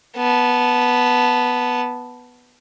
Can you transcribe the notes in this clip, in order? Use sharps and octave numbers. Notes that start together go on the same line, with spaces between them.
B3 A5